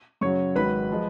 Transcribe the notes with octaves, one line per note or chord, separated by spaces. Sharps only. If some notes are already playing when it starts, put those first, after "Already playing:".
F#2 C#3 F#3 C#5 C#6
G#1 G#2 F#3 B4 B5
F3 G#3